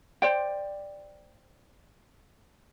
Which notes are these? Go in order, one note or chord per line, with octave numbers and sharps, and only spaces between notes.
C5 D5 G5